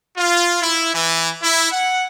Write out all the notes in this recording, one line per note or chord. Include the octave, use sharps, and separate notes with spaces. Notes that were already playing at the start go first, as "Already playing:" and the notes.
F4
E4
E3
E4
F#5